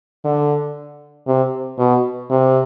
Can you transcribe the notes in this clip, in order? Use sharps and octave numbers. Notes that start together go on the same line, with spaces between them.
D3
C3
B2
C3